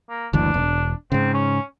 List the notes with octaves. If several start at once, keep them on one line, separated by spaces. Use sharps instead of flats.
A#3
F#1 D2 E3 D4
E1
G#2 C#3 C4
C#4